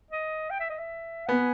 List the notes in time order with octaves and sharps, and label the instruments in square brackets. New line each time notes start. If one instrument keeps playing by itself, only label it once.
[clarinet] D#5
G5
E5
D#5
E5
[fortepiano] B3 [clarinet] G#5